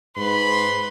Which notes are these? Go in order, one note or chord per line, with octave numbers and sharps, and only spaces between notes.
G#2 B4 B5 C6